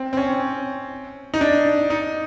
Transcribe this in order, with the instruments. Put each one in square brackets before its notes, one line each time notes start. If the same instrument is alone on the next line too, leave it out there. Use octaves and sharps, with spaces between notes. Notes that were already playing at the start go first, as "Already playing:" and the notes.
Already playing: [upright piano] C4
C4
C#4
D#4
D4
D#4